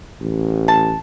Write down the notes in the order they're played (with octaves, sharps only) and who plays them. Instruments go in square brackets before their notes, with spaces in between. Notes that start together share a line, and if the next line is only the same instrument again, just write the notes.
[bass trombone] A1
[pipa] A5